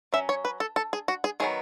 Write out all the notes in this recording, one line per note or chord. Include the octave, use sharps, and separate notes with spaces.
F#3 C#4 E5
C#5
B4
A4
A4
G#4
F#4
G#4
D#3 F#3 B3 G#4